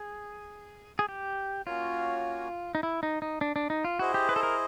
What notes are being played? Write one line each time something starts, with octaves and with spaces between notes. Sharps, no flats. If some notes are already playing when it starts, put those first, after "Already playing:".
Already playing: G#4
G#4
G4
A#3 C#4 F4 F#4 A#4 C#5
D#4
E4
D#4
D#4
D4
D4
D#4
F4
E4 F#4 G#4 C5 D#5
G4
B4
A4
A#4